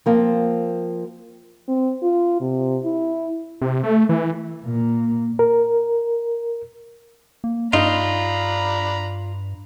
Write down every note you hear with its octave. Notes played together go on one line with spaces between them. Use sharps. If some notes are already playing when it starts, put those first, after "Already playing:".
F3 A#3 C4
C4
F4
C3
E4
C3
A3
E3
A#2 A#3
A#4
A#3
G2 D4 D#4 F4 A#5 B5